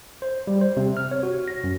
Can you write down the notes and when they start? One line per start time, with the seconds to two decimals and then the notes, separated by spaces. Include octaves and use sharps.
0.22 C5
0.47 G3
0.61 C5
0.77 C3
0.97 F6
1.11 C#5
1.23 F#4
1.48 A#6
1.64 F#2